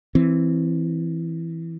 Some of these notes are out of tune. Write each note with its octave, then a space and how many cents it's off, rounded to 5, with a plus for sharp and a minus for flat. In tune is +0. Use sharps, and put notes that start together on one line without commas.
E3 +0 C4 +0